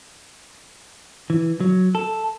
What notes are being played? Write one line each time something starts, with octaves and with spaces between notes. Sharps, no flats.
E3
F#3
A4